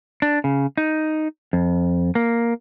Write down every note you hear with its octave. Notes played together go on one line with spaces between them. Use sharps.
D4
C#3
D#4
F2
A#3